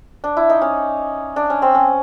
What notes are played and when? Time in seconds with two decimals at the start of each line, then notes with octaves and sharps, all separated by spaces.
0.24 D4
0.37 E4
0.50 D#4
0.62 C#4
1.36 D4
1.50 C#4
1.62 C4
1.75 C#4